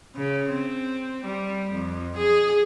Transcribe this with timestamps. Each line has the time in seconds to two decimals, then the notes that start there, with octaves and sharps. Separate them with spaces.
0.15 C#3
0.51 C4
1.25 G3
1.71 F2
2.17 G#4